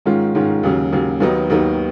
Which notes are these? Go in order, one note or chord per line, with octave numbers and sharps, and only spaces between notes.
G#2 D#3 G#3 C#4 F4
G#2 D#3 G#3 C#4 F4
D#2 C#3 F#3
D#2 C#3 F#3
D#2 D#3 F#3 B3 D#4
D#2 D#3 F#3 B3 D#4